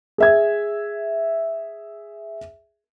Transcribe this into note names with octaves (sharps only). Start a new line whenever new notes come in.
G#4 E5 G#6